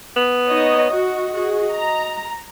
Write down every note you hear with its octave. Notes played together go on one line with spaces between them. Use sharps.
B3
D#4 C#5 D#5
F#4 D#5
F#4 G#4
A#5